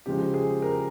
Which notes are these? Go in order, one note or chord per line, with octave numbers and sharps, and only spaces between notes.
C#3 F3 G#3 G4
G#4
A#4